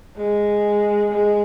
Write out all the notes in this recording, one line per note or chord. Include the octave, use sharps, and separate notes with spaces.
G#3
G#3